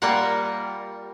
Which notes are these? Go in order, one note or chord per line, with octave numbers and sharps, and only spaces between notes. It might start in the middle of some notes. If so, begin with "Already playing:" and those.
G3 A#3 F4 A#4 F#5